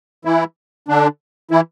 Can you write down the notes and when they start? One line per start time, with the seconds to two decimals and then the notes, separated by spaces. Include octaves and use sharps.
0.25 E3 E4
0.88 D3 D4
1.51 E3 E4